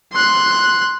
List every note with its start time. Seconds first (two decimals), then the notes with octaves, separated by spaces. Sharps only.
0.13 C6 F#6